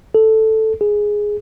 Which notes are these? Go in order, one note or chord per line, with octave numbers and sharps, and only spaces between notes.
A4
G#4